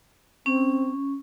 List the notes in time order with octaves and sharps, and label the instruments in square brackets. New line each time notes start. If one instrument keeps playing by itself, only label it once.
[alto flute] C4 [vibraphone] C#4